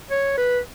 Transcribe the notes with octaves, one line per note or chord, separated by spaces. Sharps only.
C#5
B4